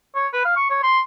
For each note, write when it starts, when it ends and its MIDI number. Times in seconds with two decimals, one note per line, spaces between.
0.15 0.28 73
0.33 0.44 71
0.45 0.56 77
0.56 0.67 85
0.70 0.80 73
0.83 1.00 84